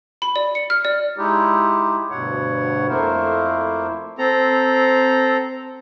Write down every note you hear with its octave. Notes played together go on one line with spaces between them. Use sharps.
B5
D5
C#7
F6
D5
G#3 D#4 E4 G4
D2 G2 B2 C#5 F#5
F2 A3 A#3 E4 A#4 C5
C4 A4 A#5